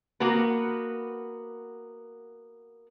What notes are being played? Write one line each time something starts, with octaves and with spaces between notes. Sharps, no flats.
A#3 B3 F#4 B4